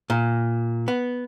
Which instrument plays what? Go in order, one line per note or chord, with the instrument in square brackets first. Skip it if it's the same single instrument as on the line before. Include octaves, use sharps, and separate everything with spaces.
[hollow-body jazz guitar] A#2
B3